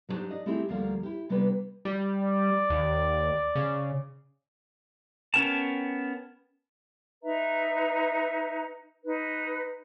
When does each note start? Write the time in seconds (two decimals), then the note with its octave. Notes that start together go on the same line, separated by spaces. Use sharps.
0.09 F#3 G3 D4 D#4 G4 C5
0.30 D5 D#5
0.46 A3 C4 D#4 E4 G4 G#4
0.69 D2 F3 G3 A#3 A#4
1.03 E4 G4
1.29 C3 G3 A#3 B3 D4 B4
1.85 G3
2.22 D5
2.70 D#2
3.55 C#3
5.34 B3 C#4 A#4 G5 A5
7.22 D#4 B4 E5 A#5
9.05 D#4 B4